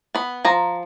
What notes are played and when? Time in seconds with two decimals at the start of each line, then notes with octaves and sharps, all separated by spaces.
0.15 B3 B5
0.45 F3 A#5